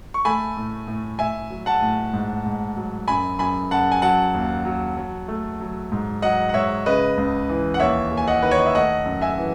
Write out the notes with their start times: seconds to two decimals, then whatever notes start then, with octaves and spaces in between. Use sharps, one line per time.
0.14 C#6
0.25 A3 G#5 B5
0.57 A2
0.88 A2
1.19 A2 E5 G#5
1.50 F#3
1.66 F#5 A5
1.82 A2
2.13 G#2
2.46 G#2
2.76 F#3
3.08 F#2 G#5 B5
3.39 F#2 G#5 B5
3.71 F#2 F#5 A5
3.92 G#5
4.02 F#3 F#5 A5
4.34 D#2
4.65 F#3
4.97 F#3
5.28 A3
5.60 F#3
5.92 G#2
6.22 F#3 D#5 F#5
6.49 F#5
6.54 G#2 C#5 E5
6.86 C#3 B4 D#5
7.17 C#2
7.49 E3
7.74 F#5
7.80 D#2 C#5 E5
8.11 D#2
8.17 G#5
8.27 D#5 F#5
8.43 D#3 B4
8.51 C#5
8.59 D#5
8.66 E5
8.75 A3 D#5 F#5
9.05 F#2
9.21 E5 G#5
9.38 E3